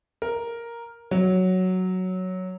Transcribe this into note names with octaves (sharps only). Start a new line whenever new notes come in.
A#4
F#3